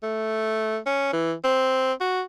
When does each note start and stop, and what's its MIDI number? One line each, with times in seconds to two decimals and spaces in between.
0.03 0.78 57
0.86 1.12 61
1.13 1.33 52
1.44 1.93 60
2.01 2.22 66